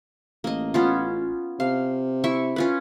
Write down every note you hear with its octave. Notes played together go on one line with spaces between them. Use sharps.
A1 A#3 D#5
B3 C#4 F4
C3 F5
E4 E5 C#6
C#4 F4 B4